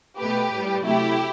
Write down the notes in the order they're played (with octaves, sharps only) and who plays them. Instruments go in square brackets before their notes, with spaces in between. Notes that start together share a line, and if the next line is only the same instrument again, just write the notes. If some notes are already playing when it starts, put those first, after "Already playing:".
[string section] B2 A3 G4 B4
A2 G3
C3 F#3 A3 E4 G4